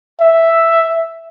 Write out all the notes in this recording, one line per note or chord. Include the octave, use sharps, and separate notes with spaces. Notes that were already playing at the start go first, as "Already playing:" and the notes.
E5